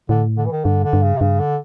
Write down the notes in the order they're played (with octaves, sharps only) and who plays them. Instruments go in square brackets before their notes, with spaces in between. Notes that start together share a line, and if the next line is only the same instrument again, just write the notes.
[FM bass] A2 [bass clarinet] D3
[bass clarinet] D3
E3
D#3
[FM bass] G2 [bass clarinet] D3
[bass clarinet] D3
[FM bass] G2
[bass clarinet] C#3
C3
[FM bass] G2 [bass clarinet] C#3
[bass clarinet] D3